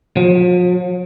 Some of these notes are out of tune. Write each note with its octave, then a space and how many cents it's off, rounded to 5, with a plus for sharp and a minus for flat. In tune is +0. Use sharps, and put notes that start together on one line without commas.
F3 +40